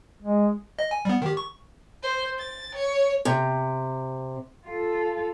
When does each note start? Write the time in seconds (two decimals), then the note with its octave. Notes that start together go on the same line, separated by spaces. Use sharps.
0.23 G#3
0.79 D#5
0.91 G#5
1.05 G3 B3
1.22 D#3 G4
1.37 C#6
2.03 C5
2.39 A6
2.75 C#5
3.25 C3
4.66 F4 A4